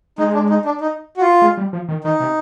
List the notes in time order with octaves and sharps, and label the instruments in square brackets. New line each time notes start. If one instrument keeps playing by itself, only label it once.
[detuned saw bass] G#3 [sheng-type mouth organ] D#4
[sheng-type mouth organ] D4
D#4
D4
D#4
F#4
F4
[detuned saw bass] G#3
G3
F3
D#3
[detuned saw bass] D#3 [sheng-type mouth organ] D#4
[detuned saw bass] C3